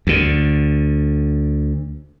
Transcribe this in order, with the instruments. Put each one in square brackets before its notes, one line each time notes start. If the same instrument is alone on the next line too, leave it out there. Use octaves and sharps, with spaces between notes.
[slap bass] D2 D3